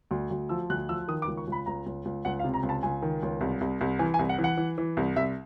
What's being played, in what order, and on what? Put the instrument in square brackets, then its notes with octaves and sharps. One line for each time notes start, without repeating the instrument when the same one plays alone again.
[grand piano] D2
D2
F3 E6
D2 F#6
F3 E6
D#3 D#6
D6
C#2
C#6
C#2
B5
C#2 A#5
C#2
C#2
C#2 F#5
F5
C3
A#5
C#2
A5
C#2 G#5
D#3
C#2
C2
C2
C2
E3 G#5
G#5
C2
F#5
E3
F#5
E3
E3
C2
C2 E5